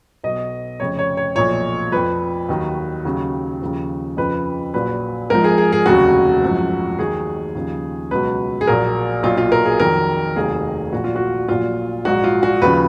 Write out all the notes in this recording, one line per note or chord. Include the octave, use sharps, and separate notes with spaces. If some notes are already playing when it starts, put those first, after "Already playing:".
B1 B2 F#3 D#5
F1 F2 C#3 C#5
C#5
C#5
B1 A#2 F3 C#5
F2 F3 B4
D#2 D#3 F#3
D#2 C#3 F#3
D#2 C#3 F3
F2 C#3 F3 B4
A#1 A#2 F#3 B4
G#1 G#2 F3 A#4
G#4
G#4
G#4
F1 D#2 C#3 F#3 F#4
G#1 F#2 F3
D#2 D#3 F#3 G#4
D#2 C#3 F3
C#2 B2 F#3 B4
G#4
A#1 A#2 F#3 A#4
B1 A#2 F#3 F4
F4
A#4
G#4
F2 D#3 F#3 A#4
F1 D#2 D#3 F#3 G#4
A#1 A#2 F#3 F#4
F4
F#4
A#1 A#2 F#3 F4
A#1 G#2 F#3 F#4
F4
F#4
D#2 C#3 F3 B4